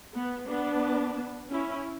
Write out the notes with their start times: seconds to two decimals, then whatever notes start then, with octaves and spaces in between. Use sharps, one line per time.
0.14 B3
0.48 B3 D4
1.51 C#4 E4